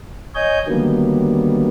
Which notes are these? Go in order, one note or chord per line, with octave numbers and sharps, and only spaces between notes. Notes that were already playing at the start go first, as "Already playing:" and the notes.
C#5 D#5 G#5 G6
D3 D#3 F#3 G3 A#3 B3